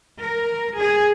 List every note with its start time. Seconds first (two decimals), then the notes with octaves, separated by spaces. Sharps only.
0.22 A#4
0.78 G#4